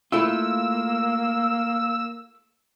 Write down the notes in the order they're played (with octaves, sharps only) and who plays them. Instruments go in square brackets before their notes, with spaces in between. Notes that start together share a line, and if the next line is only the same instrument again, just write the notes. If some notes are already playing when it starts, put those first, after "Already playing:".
[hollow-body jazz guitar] A3 E4 F4 [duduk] A#3 [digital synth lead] E6